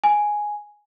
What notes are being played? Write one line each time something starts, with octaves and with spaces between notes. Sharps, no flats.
G#5